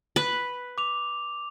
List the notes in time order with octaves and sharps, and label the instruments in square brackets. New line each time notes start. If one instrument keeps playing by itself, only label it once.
[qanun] B4
[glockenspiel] D6 F7